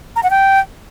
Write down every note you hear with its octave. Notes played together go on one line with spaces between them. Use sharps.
A#5
F#5
G5